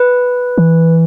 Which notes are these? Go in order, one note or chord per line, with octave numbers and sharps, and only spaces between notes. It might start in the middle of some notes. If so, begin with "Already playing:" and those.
Already playing: B4
E3